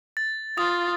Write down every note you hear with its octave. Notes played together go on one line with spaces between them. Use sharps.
A6
F4 D#6 A6